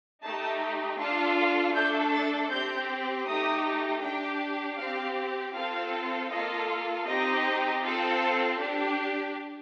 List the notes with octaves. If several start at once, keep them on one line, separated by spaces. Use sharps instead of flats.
A3 D#4 G4 A5
D4 F4 A4 A5
A3 D4 A4 G6
A6
C4 G4 G6
A3 D#4 G4 D#6
D4 G5
G4
C4 G4 F5
C4 F4 A4 F5
A#3 F4 A4 D#5
C4 D#4 G4 D#5
C4 F4 A4
D4 G4